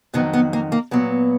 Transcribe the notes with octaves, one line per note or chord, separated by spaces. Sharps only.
F2 D#3 F#3 B3
B3
A#3
A#3
A#2 F#3 B3